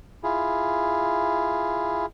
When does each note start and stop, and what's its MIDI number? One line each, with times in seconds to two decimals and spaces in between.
0.23 2.06 64
0.23 2.06 65
0.23 2.06 68